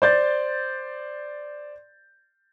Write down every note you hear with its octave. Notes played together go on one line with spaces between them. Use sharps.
C5 D5 G6 A6